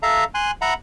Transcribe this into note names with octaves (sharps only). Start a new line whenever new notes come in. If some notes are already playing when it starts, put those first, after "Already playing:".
A4 E5 F5 A#5
G#5 C6 F#6
E5 F#5 A#5 B5